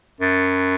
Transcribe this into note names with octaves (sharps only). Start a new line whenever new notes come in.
F#2